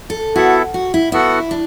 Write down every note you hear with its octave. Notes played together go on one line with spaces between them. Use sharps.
A4
B3 E4 F#4 A4 E5
F#4
E4
B3 E4 F#4 A4 F#5
D4